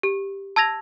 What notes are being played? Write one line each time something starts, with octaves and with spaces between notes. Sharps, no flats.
G4
A5 E6 G#6 A#6 F7